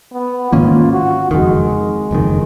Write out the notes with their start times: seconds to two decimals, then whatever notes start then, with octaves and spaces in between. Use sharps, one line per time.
0.12 B3
0.51 G#2 D#3 A#3 C#4 F4
0.92 F#4
1.31 F#1 F2 D#3 G#3
2.11 F#1 F2 D#3